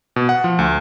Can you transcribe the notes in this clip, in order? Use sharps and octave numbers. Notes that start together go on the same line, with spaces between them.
B2
F#5
F3
D2